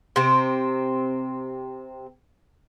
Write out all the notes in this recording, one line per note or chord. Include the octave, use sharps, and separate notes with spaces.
C3 C4